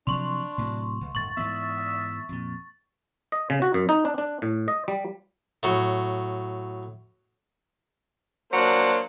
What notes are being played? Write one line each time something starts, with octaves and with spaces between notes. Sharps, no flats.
C3 F3 F#3 D4 C6 C#6
A2 C3 F#3
C#2
D1 G2 C#6 A6
G#2 E3 B3 E5
F2 A#2
D#5
C#3
F#4
F#2
D#4
D4
D4
A2
D#5
G3
A2 F#3
F#3 A#3 D4 C5